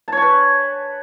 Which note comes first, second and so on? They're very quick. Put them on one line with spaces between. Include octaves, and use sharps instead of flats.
A5 C#5 G#5 B4